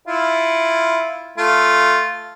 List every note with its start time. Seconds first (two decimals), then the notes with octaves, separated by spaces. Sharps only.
0.07 E4 F4
1.38 A3 F4